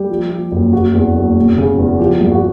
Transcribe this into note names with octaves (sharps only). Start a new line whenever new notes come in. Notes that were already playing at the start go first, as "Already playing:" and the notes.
Already playing: G3 G4
F3
F3
F#1
F#1 F#4
E2
F#1
E1
C#3
E2
F3 G4
G2
F#4